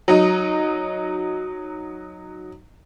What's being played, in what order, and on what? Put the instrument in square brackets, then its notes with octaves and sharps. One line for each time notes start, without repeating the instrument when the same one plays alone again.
[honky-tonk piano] F#3 D#4